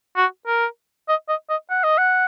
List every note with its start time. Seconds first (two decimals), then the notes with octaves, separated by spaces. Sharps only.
0.16 F#4
0.47 A#4
1.09 D#5
1.29 D#5
1.50 D#5
1.70 F#5
1.84 D#5
1.98 F#5